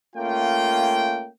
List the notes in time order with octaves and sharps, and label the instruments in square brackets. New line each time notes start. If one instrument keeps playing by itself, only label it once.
[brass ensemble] A3 A#3 C#4 F4 G5